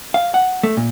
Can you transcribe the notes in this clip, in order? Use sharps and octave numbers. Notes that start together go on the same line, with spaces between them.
F5
F#5
A3
A#2